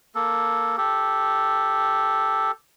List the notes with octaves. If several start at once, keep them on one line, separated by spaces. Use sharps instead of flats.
A#3 A4
G4 A4